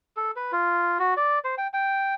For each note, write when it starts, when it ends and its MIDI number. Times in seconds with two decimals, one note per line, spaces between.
0.17 0.31 69
0.36 0.52 71
0.52 0.98 65
0.99 1.14 66
1.17 1.39 74
1.45 1.55 72
1.58 1.67 79
1.73 2.15 79